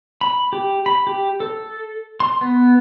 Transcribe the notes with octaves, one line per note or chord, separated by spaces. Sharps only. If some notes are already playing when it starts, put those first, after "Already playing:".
B5
G4
B5
G4
A4
C6
B3